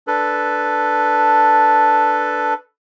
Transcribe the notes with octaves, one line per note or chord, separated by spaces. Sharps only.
D4 A4 B4